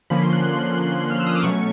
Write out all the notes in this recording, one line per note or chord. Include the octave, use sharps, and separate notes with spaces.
D3 F3 A#3 C#4 B5
C6
F#6
F6
E6
D#6
D6
B2 F#3 A3 C#4 C#6